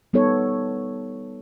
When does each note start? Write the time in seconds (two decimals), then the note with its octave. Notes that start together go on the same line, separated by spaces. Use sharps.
0.13 G3 B3 D#4 A4 C#5